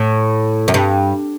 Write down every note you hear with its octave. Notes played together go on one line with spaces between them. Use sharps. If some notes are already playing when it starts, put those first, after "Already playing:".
Already playing: A2
F#2
G2